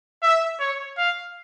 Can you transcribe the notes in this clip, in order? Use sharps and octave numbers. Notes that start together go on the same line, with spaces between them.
E5
C#5
F5